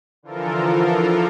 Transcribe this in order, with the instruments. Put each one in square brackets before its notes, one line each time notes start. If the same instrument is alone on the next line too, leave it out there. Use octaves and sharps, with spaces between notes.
[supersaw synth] D3 E3 F3 F4 A4 A#4